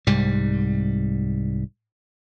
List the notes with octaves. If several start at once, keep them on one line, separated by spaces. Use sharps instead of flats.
C2 G#2 G3